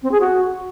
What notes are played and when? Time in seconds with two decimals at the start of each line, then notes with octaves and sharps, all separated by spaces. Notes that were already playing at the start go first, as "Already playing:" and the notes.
0.03 C4
0.12 G#4
0.20 F#4